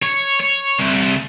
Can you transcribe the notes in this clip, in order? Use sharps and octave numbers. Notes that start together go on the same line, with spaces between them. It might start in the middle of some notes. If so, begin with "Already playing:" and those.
C#5
C#5
C2